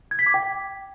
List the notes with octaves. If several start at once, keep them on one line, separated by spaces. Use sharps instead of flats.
G#6
B6
D6
G5